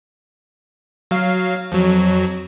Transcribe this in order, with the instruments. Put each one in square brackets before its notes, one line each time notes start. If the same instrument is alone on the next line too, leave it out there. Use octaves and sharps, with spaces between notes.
[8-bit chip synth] F#3 F5
F2 F#3